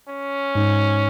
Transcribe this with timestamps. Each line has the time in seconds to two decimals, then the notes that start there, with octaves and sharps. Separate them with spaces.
0.09 C#4
0.55 G#2